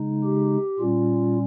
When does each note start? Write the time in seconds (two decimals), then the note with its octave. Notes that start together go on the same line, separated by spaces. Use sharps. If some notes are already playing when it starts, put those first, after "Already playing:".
Already playing: C#3 G#3 D#4
0.24 G4
0.79 A#2 G3 C#4 F4